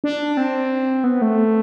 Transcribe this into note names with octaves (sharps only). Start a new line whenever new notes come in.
D4
C4
B3
A3